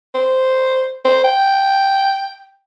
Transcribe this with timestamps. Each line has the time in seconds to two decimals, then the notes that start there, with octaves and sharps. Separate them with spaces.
0.15 C5
1.05 C5
1.24 G5